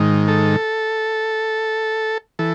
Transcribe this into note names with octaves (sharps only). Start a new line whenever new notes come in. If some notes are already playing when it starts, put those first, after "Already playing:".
Already playing: G#2 D#3
A4
E3 A4